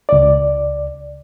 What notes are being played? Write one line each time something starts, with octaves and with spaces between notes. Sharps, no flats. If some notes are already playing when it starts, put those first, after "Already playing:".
C#2 D5